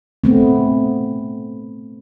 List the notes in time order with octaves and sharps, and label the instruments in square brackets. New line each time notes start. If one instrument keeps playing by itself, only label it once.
[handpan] A3 B3 C4